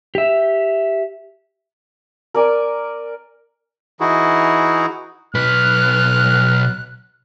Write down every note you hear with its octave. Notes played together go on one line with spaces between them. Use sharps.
G4 E5
A#4 D5 G#5
E3 D#4 E4 F#4 G#4
B1 B4 F6 F#6